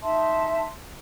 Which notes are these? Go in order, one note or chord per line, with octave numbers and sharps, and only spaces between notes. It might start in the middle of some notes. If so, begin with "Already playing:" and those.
D#4 E5 A5 C6